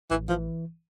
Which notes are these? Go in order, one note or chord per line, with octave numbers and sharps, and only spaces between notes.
A1 E3
E3 F3